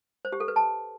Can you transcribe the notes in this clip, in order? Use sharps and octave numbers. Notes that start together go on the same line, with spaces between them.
C5
G4
A4
B4
A5